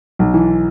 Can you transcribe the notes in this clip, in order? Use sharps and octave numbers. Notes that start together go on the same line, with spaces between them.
B1
E3